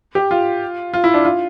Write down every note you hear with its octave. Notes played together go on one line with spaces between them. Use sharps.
G4
F4
F4
E4
D4
F4